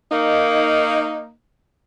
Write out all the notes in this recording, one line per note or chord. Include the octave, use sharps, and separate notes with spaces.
A#3 D#4